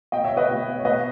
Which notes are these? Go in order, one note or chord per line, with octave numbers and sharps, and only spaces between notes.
B2 D#5 G5
C#5 E5
B4 D#5
B2
C#5
B2 B4 D#5